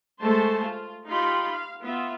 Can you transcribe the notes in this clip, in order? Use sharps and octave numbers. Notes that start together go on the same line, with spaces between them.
G#3 A3 A4 C5 A5 C6
F4
D#4 F4 G4 F5 B5 C6
F5
B3 F4 E5